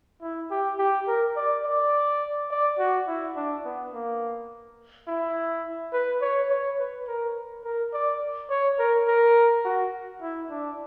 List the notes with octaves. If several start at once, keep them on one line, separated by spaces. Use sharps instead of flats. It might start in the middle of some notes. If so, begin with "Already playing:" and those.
E4
G4
G4
A#4
D5
D5
D5
F#4
E4
D4
B3
A#3
E4
B4
C#5
C#5
B4
A#4
A#4
D5
C#5
A#4
A#4
F#4
E4
D4